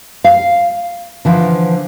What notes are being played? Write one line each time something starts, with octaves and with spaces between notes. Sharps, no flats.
F5
D3 E3 F3